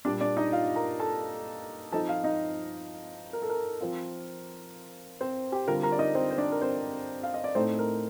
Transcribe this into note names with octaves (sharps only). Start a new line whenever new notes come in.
A#2 G3 D4 D5
D4 D5
D#4 D#5
F4 F5
A#4 A#5
A4 A5
F3 C4 D#4 A4 A5
F4 F5
D#4 D#5
A#4
A4
A#4
F3 C4 F4
C4 C5
G4 G5
D3 G3 C4 F4 A#4 A#5
A#4 A#5
D5
D#4 D#5
C4 C5
C5
D4 D5
A#4
C4 C5
F5
D#5
D5
A2 A3 C4 D#4 C5
A#4